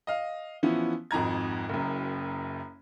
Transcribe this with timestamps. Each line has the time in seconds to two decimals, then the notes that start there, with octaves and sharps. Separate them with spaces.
0.07 D#5 F5
0.63 E3 F3 B3 C#4 E4
1.11 G#1 F2 G#2 A#5 G#6
1.69 F#1 F#2